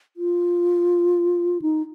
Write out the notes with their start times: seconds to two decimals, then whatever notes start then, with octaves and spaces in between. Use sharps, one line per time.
0.17 F4
1.62 D#4